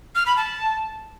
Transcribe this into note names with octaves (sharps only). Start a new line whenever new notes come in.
F6
B5
A5